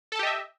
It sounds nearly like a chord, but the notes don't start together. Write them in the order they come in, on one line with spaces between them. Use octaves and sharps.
A4 A5 G4 D#5 E5